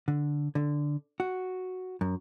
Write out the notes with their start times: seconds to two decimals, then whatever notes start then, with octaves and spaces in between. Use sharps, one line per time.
0.08 D3
0.55 D3
1.20 F#4
2.01 F#2